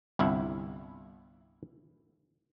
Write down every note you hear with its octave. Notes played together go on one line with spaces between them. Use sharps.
G1 C2 E4